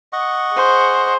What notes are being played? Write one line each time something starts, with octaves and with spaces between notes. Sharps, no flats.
D#5 F#5 C#6
G#4 C5